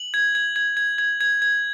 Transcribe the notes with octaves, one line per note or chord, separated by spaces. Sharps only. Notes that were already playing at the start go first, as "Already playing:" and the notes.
Already playing: F#7
G#6
G#6
G#6
G#6
G#6
G#6
G#6